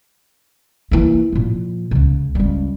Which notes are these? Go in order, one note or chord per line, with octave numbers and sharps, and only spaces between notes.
E3 A#3
A#2 F3
C#2 C#3
C#2 G3